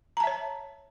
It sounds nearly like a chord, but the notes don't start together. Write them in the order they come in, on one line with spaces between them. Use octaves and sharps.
A#5 A5 E5 C#5